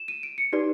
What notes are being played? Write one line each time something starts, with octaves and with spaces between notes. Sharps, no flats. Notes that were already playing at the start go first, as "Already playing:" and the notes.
Already playing: E7
D#7
D7
C#7
D#4 G4 B4 D5